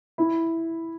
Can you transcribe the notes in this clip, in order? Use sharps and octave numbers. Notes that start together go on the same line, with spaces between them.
E4